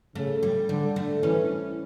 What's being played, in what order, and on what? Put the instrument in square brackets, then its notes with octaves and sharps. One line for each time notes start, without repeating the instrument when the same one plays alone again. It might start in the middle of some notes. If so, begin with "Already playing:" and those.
[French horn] C#3 [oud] A3
[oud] G3
[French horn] D3 [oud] G3
[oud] A3
[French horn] E3 [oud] C#4